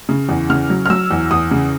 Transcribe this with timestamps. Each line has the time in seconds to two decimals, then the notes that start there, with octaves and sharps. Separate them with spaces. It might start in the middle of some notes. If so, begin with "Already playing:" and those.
0.09 C#3
0.29 E2
0.50 C#3 F6
0.70 F#3
0.86 F6
0.90 F#3 E6
1.11 E2
1.31 E2 D#6
1.51 C#3